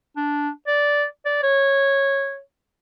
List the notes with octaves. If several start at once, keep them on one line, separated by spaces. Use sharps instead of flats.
D4
D5
D5
C#5